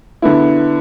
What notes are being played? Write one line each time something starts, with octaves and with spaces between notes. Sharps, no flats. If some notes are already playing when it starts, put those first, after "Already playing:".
D3 B3 E4